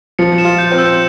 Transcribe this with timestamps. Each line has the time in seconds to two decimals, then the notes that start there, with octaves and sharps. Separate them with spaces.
0.19 F3 C#7
0.38 E7
0.45 F4
0.58 G6
0.71 C4
0.78 E6